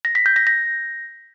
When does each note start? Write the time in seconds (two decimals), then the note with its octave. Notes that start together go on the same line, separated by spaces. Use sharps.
0.05 A#6
0.15 B6
0.26 G6
0.36 A#6
0.47 A#6